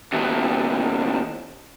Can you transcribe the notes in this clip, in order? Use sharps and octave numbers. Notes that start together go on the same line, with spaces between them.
D#2 B2